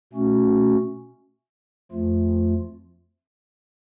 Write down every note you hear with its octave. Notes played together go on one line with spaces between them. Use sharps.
B2 A3 C#4 F#4
F2 F3 A3 F4